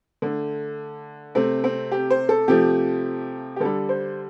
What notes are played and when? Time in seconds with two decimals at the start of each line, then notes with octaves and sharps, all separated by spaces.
0.22 D3 A3
1.35 C3 A3 C4
1.64 C4
1.91 G4
2.10 C5
2.29 A4
2.48 C3 F3 A3 G4
3.56 G4
3.60 D3 G3 A4
3.89 C5